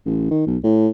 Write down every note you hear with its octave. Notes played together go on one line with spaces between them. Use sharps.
A1
D#3
B1
A2